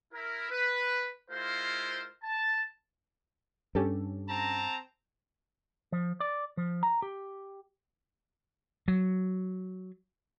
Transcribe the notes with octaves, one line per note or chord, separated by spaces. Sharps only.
E4 A#4
B4
G#3 E4 F4 A#4 C5 F5
A5
G2 C#4 G4 A4
C4 A5 A#5
F3
D5
F3
A#5
G4
F#3